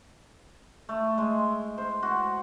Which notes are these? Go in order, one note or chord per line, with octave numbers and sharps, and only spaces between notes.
A3
G#3
C5
F#4